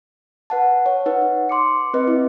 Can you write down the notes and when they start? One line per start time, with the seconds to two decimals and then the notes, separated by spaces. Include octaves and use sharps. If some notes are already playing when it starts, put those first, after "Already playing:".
0.50 B4 F#5 A5
0.86 C#5
1.06 D#4 B4 F#5
1.49 C6 D6 C#7
1.94 C4 B4 D#5
2.07 E4